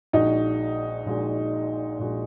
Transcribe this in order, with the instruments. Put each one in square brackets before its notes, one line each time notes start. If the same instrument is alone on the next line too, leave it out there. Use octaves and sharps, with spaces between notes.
[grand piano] A#1 A#2 G#3 F#4 [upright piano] D#4
[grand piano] A#1 A#2 G#3 F#4
A#1 A#2 G#3 F#4